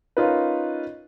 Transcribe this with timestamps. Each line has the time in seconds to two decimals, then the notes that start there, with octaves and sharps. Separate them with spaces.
0.17 C#4 D#4 F4 A#4 B4